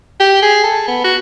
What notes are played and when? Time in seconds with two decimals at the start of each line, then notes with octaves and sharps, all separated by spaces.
0.20 G4
0.43 G#4
0.64 A4
0.88 B3
1.04 F#4